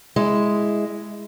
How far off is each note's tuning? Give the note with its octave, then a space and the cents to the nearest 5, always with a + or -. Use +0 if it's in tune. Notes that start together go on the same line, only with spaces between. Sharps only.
G#3 +0 E4 +0